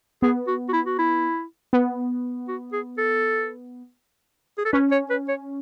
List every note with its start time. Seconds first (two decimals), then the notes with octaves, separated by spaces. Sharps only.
0.22 B3 G#4
0.47 F#4
0.69 F#4
0.73 E4
0.86 F#4
0.98 E4
1.73 B3
2.48 F#4
2.73 G#4
2.98 A4
4.58 G#4
4.65 A4
4.73 C#4 B4
4.92 C#5
5.10 B4
5.28 C#5